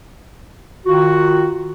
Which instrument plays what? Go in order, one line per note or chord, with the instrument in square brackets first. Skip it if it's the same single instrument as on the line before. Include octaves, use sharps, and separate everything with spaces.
[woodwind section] D#3 F4 F#4